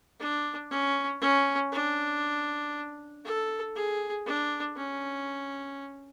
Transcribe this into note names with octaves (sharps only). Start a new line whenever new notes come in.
D4
C#4
C#4
D4
A4
G#4
D4
C#4